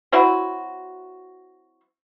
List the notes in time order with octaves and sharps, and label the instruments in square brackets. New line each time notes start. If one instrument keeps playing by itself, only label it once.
[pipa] F#3 C4 E4 F#4